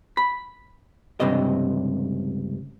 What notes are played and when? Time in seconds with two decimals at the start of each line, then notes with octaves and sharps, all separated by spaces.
0.17 B5
1.20 C#2 G2 C3 D#5